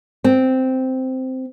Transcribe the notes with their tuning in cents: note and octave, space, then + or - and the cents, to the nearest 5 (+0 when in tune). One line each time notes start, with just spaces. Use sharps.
C4 -10